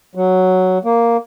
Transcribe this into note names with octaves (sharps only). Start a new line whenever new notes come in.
F#3
A#3